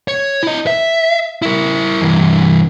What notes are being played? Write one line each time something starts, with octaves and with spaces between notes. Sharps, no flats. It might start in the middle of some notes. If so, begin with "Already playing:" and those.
C#5
E4 D#5
E5
E4 A#4
G2 E3